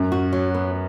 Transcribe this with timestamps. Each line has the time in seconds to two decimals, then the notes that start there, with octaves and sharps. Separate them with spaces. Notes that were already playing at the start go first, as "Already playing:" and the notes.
Already playing: F#2
0.12 F#4
0.33 F#3
0.54 B3